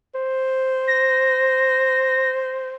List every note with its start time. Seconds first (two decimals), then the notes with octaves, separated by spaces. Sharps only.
0.15 C5
0.87 A#6